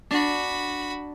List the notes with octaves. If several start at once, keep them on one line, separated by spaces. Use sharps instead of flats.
D4 F#4 B5